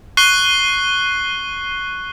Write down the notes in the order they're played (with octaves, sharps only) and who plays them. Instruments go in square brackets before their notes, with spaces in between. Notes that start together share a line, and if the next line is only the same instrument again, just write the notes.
[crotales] C#6 F#6 C7 D#7 G7